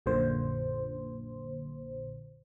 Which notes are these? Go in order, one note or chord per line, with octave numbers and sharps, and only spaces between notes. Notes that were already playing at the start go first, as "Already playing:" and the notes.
A#1 F#2 A#2 D3 C5